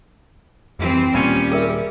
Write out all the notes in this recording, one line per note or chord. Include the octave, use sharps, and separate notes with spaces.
F2 E3 G3 C4
D#2 A#2 F3 G3 A#3 C#4 B5
G#4 A#4 E5